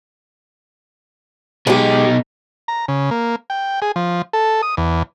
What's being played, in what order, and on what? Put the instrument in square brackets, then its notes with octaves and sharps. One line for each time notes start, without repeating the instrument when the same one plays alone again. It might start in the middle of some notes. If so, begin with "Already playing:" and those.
[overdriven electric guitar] B2 D#4 [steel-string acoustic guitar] G#3 G4
[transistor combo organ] A#5
C#3
A#3
G5
G#4
F3
A4
D#6
E2